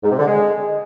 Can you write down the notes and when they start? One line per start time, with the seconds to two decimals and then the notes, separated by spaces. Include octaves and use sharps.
0.03 G#2
0.11 C3
0.19 D3
0.27 G#3